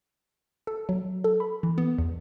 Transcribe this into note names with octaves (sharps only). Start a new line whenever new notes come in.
A4
F#3
A4
B5
E3
B3
E2